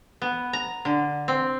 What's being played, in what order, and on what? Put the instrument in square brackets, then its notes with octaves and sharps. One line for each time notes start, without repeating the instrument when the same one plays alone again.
[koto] B3
A#5
D3
C4